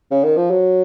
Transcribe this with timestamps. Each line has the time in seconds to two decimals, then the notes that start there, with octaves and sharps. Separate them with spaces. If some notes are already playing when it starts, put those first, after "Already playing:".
0.11 C#3
0.24 D#3
0.37 F3
0.50 F#3